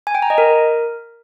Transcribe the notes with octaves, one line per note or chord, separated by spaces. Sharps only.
G#5
G5
A#5
D#5
A#4